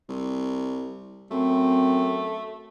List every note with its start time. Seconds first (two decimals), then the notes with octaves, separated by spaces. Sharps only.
0.09 C2
1.31 F#2 A3 C4